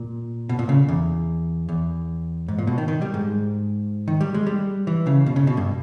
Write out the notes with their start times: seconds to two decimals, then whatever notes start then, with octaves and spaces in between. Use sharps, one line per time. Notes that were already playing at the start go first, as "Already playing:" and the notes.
Already playing: A#2
0.49 B2
0.59 A#2
0.69 C#3
0.88 E2
1.69 E2
2.48 G#2
2.59 A#2
2.67 B2
2.78 D#3
2.88 D#3
3.02 G3
3.14 G#2
4.08 D#3
4.21 G3
4.34 G#3
4.46 G3
4.87 E3
5.07 C#3
5.26 B2
5.36 C#3
5.47 B2
5.57 G2